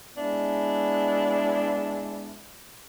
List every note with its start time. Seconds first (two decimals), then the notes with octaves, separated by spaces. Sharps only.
0.16 G#3 B3 D4 E4